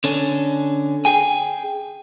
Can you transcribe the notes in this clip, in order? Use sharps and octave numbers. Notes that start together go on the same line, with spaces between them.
D3 C#4 D4
G#4 G5 G#5